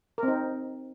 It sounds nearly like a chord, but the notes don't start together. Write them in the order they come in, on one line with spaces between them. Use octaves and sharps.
A#4 C4 D#4